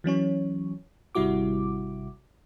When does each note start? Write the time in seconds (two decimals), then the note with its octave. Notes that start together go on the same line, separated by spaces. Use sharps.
0.04 E3 F#3 C#4 C#5
1.15 G#1 C3 G3 E4 F#4 D6